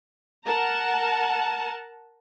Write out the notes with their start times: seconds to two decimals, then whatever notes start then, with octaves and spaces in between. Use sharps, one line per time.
0.47 A#4 F#5 A5 A#5